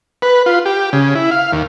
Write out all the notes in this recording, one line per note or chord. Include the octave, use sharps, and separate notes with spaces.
B4
F4
G4
C#3
E4
F5
D#2